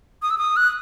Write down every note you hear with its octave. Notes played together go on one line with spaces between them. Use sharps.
D#6
E6
D#6
F#6